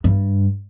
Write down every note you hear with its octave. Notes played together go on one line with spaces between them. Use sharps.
G2